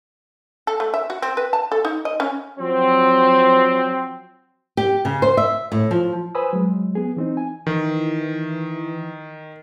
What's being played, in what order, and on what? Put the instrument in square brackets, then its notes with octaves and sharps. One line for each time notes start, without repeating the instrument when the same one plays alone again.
[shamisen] A4
A3
E5
F#4
C4
B4
A5
A4
D#4
D#5
C#4
[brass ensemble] F3 F#3 C4
[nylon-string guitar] G4
C#3
C5
E5
A2
F3
[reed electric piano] B4 C5 G#5 B5 D#6 E6
F#3 G#3
B3 G#4
E3 C4 D#4
G#5
[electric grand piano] D#3 [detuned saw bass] E3